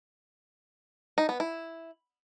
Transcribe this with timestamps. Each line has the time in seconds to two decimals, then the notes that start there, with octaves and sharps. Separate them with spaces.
1.18 D#4
1.29 B3
1.40 E4